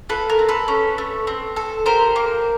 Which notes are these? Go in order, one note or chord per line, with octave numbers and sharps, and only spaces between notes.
F4 A4 B4
A#4
C4
A4 B4
C#4
A3
C4
A4
G4 A#4 C5
A#3